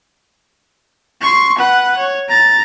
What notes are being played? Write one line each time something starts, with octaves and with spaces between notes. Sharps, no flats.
C6 C#6
B4 F#5
C#5
A#5 A6